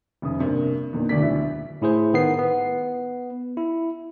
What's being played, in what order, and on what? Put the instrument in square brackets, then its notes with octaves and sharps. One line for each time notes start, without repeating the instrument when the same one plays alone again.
[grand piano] F1 C#3 D#6
G2 C3 A#3
E2 A#2 D3 D#3
D#1 D2 D5 B6
D1 D2 E4
[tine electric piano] A2 E4 G#4 C5
D#3 B3 C7
B3
E4